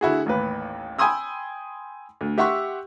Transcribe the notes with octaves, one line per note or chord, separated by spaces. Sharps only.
D3 E4 F#4 G#4
A1 D#2 B4
G5 G#5 B5 C6 D#6 E6
D2
G4 E5 F#5 C6 C#6 E6